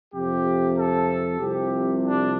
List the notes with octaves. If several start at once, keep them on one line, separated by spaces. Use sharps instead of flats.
F2 C3 F3 G4
A4
C2 C3 F3 G4
D4